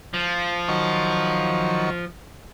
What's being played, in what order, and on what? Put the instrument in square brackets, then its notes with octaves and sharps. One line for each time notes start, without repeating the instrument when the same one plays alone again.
[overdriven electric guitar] F3
[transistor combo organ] D#3 F#3 C#6